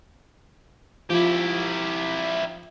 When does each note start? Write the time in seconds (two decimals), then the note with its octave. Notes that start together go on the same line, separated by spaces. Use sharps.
1.10 F3 E4 G4